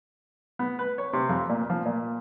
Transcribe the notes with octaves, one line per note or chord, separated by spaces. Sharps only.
B3
B4
C#5
C3
F2
A#2
F3
A#2